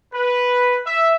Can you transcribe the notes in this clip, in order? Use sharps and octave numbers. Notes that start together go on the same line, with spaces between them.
B4
E5